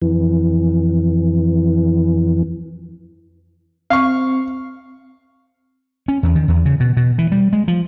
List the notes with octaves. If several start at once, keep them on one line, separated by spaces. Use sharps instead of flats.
F2 E3
C4 F5 C#6
C#4
E2
D#3
E2
C#3
B2
B2
E3
G3
G#3
F3